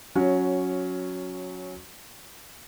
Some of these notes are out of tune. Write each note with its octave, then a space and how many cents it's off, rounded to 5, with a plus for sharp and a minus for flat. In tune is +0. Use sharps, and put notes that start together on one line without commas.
F#3 -15 C#4 +0